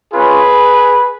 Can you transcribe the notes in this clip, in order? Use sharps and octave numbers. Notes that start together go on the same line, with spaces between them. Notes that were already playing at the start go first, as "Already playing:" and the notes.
G#3 C#4 F4 G#4 B4